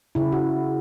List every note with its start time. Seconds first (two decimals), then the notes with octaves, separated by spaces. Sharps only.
0.15 C#3 E4
0.32 F#4